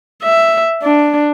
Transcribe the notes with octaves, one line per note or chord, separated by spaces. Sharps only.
E5
D4